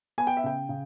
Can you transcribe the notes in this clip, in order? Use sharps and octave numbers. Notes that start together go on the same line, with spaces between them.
B3 G#5
G5
E5
C#3 G5
C#3